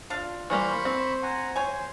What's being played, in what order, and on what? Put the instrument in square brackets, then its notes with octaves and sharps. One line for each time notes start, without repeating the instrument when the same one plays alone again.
[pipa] D4 F5 [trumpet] F4
[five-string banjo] E3 G3 A#3 [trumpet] C5 [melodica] B5 C#6
[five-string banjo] C4
[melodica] F#5 G#5 A#5
[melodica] C5 [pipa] C#5 G#5